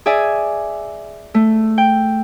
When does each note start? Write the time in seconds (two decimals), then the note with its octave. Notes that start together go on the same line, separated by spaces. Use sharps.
0.06 G#4 D5 E5 G#5
1.34 A3
1.78 G5